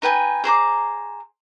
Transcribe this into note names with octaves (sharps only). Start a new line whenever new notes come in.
D#4 B4 G5 G#5
G#4 C5 A#5 D6